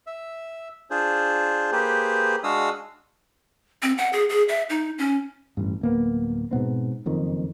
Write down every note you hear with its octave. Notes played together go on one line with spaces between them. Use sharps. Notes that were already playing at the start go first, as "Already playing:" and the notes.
E5
D4 F4 G#4 C5
A#3 G4 G#4 B4 C5
G#3 D4 F#4 F5 D#6 E6
C4
F#5
G#4
G#4
E5
D#4
C#4
A1 G2
D1 A#3 B3
G#2 B2 B3 C4
F#1 F2 D#3